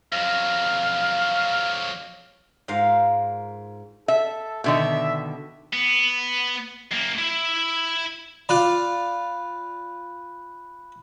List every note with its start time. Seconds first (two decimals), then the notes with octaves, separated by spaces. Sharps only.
0.12 F2 F#3 F5
2.68 G#2 F4 A#4 F5
4.08 A4 E5
4.64 B2 D3 D#3 E5
5.73 B3
6.92 F#2 A#3
7.18 E4 E5
8.49 F4 D5 B5 F#6